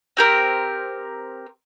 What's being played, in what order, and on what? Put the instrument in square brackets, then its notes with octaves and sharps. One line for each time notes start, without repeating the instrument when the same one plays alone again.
[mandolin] C4 G4 A#4 F6